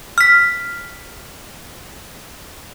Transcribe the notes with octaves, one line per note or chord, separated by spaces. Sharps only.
F6 B6